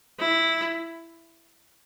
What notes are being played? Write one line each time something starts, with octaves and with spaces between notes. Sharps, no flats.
E4